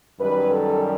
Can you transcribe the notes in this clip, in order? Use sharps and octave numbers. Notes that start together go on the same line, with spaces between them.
F#2 D#3 G3 B4
A4